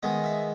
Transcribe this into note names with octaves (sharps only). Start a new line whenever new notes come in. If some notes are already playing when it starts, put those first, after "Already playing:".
D#3 G#3 B3 D#5
E5